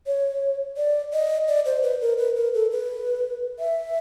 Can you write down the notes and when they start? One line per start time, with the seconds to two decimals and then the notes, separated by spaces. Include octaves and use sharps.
0.07 C#5
0.77 D5
1.13 D#5
1.48 D5
1.65 C5
1.83 B4
2.01 A#4
2.18 B4
2.36 A#4
2.54 A4
2.71 B4
3.59 E5